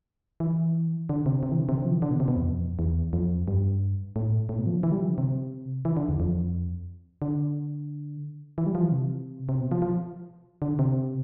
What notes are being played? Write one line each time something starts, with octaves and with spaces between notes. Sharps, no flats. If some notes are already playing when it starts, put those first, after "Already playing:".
E3
D3
C3
C3
E3
D3
C3
D3
F3
E3
D3
B2
C3
B2
E2
F2
E2
F2
G2
A2
A2
B2
F3
D3
E3
G3
F3
D3
C3
E3
D3
E2
F2
D3
E3
G3
F3
E3
C3
C3
B2
F3
F3
D3
C3